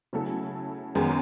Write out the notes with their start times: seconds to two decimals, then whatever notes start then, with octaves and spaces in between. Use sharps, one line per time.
0.13 C#3 F#3 A3 E4 A4
0.95 F#2 D#3 G#3 B3